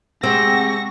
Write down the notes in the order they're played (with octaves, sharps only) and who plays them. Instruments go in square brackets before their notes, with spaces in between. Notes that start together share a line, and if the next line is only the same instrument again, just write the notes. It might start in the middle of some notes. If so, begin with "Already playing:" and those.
[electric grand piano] C3 G#3 G4 [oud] C4 [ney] F#5 [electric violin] C#6 A#6